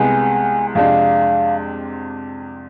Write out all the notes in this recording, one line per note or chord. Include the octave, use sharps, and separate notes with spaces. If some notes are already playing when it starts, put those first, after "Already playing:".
Already playing: C2 C3 G#3 B3 G#5
F2 C3 G#3 D4 F5